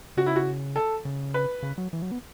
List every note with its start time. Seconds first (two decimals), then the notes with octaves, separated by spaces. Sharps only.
0.17 C#3 F#4
0.26 E4
0.36 F#4
0.76 A4
1.05 C#3
1.34 B4
1.63 C#3
1.78 F#3
1.93 E3
2.02 F#3
2.11 B3